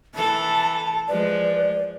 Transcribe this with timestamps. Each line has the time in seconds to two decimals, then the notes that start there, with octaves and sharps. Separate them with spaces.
0.15 E3 A4 A5
1.08 F3 G#3 B4 D5